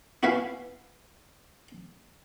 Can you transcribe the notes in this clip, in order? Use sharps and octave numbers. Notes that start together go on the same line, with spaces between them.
E4 F#4 B4 E5 F5 G#5